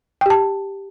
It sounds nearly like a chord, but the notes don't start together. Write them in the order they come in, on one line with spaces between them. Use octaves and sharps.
G5 G4 A5